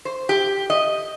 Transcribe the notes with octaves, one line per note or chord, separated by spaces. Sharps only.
C5
G4
D#5